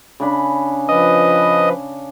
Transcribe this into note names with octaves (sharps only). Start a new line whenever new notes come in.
C#3 D4 B5
F3 B4 D#5